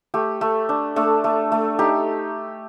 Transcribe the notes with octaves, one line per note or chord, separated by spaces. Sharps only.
A3 G4
A3
D4
A3 D4 A4
A3
A3
D#4 G4